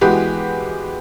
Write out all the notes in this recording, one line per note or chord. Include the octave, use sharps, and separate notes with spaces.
E3 G#3 B3 F#4 G4 B4